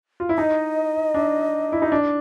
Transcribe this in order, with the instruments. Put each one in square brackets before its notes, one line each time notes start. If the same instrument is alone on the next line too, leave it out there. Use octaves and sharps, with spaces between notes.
[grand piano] F4
E4
[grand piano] D#4 [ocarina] D#5
[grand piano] D4
E4
D#4
D4